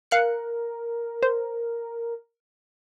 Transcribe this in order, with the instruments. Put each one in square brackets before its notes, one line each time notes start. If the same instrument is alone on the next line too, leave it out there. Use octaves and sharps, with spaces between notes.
[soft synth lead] A#4 [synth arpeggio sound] F5 F#6 C#7
[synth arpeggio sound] C5